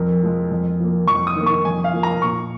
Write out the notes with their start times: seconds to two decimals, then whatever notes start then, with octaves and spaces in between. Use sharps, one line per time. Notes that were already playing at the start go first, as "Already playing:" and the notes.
Already playing: F2 A#4
0.23 F3 G#3
0.52 F2
0.80 F3 A#3
1.08 F2 C#6
1.27 D#6
1.36 D#3 A#3
1.46 C#6
1.65 F2 G#5
1.84 F5
1.93 F3 A#3
2.03 A#5
2.22 A#2 C#6